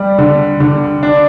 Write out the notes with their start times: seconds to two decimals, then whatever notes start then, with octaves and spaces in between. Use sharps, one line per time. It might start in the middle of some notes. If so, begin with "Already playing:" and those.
Already playing: G3
0.18 D3
0.60 D3
1.03 D4